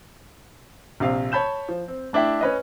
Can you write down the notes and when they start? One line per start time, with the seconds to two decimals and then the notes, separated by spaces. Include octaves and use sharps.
1.00 A#1 C3 F5
1.32 C#5 A5 B5 G6 E7
1.69 F3
1.88 C4
2.13 A3 D4 E4 E5 G5
2.41 C#4 B4 D#5